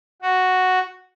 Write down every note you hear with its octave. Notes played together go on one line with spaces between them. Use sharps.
F#4